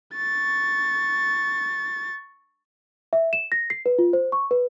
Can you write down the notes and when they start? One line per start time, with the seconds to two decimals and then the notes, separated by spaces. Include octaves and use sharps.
0.16 C#6 A6
3.13 E5
3.33 E7
3.52 A#6
3.70 C7
3.86 B4
3.99 F4
4.13 C5
4.32 C#6
4.51 B4